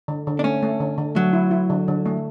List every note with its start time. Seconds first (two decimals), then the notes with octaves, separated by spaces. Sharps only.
0.08 D3
0.27 D3
0.39 D4
0.44 A3 C#4
0.63 A3
0.80 D3
0.98 D3
1.15 F#3 A3
1.33 E4
1.51 E4
1.70 D3
1.88 D3
2.06 A3